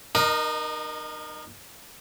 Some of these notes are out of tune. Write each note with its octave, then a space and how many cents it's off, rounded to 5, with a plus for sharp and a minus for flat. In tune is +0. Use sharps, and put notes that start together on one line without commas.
D#4 -35 A#4 +15 D#5 +0